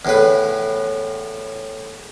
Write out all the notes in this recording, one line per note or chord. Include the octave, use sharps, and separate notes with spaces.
E2 A2 B4